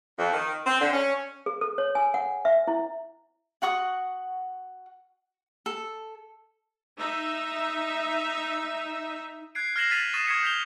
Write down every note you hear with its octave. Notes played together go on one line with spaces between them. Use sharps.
F2
D#3
C4
D3
C#4
G#4
A4
C#5
G#5
F#5
E5
E4
F#4 F#5 C#6 D#6
A4
D#4 E5
F#6 G#6 C7 D7
F6 G#6 A#6 C7 E7 F#7
F6 A6 B6 D#7 F7 F#7
C#6 D#6 A6 B6 D#7 E7
C#6 D#6 G#6 B6 C#7 E7
G6 B6 F7 G7